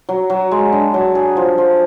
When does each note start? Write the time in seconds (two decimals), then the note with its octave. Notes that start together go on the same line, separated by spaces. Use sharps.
0.09 F#3
0.30 F#3
0.51 G#3
0.72 D4
0.94 F#3
1.15 G#4
1.37 F3
1.58 F3